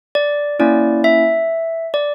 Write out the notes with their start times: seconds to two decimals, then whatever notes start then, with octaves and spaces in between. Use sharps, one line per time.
0.15 D5
0.59 A#3 C#4 E4 D5
1.04 E5
1.94 D5